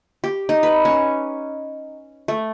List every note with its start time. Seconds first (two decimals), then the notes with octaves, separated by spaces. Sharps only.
0.24 G4
0.49 D#4
0.63 B4
0.85 C#4
2.28 A3